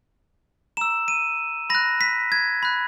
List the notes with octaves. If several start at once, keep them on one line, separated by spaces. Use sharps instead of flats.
A#5 E6 E7
D#7
B5 F#6 A#6
B6
G#6
B5 F#6